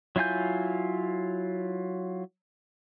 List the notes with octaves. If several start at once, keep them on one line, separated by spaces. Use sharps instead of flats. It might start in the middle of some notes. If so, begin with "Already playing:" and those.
F#3 E4 F4 G#5 G6